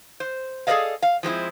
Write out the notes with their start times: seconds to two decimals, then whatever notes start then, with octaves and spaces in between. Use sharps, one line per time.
0.20 C5
0.67 G#4 A4 C5 D5 D#5 F5
1.02 F5
1.23 F3 G#3 C4 E4